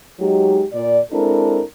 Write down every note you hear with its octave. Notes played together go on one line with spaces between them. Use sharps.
F#3 G#3 D#4 G4
A#2 D5
G#3 C4 D4 E4 A4 A#4